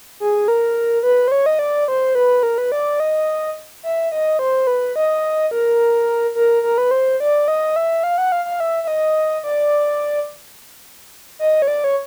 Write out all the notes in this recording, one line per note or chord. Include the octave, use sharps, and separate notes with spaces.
G#4
A#4
B4
C5
C#5
D#5
D5
C5
B4
A#4
B4
D5
D#5
E5
D#5
C5
B4
D#5
A#4
A#4
A#4
B4
C5
D5
D#5
E5
F5
F#5
F5
F5
E5
E5
D#5
D5
D#5
C#5
D5
C#5